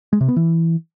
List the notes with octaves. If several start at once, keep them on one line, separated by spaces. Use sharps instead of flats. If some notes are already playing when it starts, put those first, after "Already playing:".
G#3
C3
B3
E3